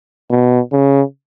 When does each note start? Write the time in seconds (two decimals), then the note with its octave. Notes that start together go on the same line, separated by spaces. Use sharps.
0.30 B2
0.72 C#3